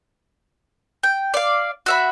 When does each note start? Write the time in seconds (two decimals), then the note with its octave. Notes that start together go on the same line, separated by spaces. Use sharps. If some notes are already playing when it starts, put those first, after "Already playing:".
1.03 G5
1.34 D5 F5
1.86 F#4 E5 B5